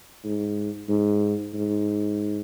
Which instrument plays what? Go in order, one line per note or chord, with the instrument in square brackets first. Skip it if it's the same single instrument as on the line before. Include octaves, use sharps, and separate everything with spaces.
[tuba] G#2
G#2
G#2